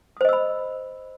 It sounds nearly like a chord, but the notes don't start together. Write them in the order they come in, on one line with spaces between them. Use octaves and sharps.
D#6 C5 D#5 E6 B5